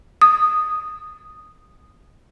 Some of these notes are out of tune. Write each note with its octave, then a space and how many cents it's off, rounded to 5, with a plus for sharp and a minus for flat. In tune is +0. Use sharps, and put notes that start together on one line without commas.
D#6 -5